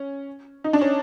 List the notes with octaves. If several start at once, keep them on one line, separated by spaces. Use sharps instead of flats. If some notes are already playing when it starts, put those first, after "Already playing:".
Already playing: C#4
D#4
D4
C#4